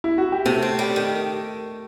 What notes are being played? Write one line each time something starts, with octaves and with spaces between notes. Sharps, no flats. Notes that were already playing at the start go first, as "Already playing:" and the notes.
E4
F#4
G4
C3 A3 A4
C4
G3
D#3